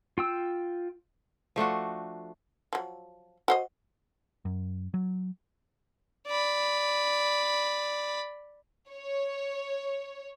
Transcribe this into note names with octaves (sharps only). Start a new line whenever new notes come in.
F4 G5 E6
F3 A3 D4 F#4
F3 F#3
F#4 C5 D#5
F#2
F#3
D5 B5
C#5